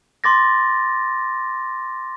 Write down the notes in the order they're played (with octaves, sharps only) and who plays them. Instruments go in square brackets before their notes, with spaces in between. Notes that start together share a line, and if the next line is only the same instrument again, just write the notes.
[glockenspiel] C6 D6 A6 A#6